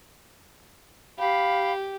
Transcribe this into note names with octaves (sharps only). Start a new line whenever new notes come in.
G4 F5 B5